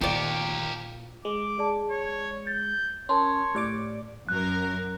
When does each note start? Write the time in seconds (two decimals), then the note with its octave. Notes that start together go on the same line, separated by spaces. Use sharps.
0.01 A#2 D#3 F4 G4 A#4 D5 F5 C#7
1.25 G#3 D6
1.58 G#4 D5 A5
1.91 C#5
2.47 G6 A6
3.09 C#4 A#4 C#5 A5 C6
3.55 A2 G4 D5 D6
4.29 F#2 A#4 F#6